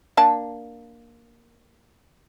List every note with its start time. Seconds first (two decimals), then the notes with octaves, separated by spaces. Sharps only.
0.17 A#3 D4 A5